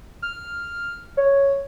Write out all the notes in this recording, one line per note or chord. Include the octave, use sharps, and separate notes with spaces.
F6
C#5